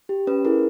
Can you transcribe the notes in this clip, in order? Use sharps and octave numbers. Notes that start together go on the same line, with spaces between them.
G4
C#4 B4
E4 G#4 A#4